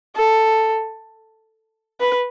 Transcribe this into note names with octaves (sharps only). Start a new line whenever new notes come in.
A4
B4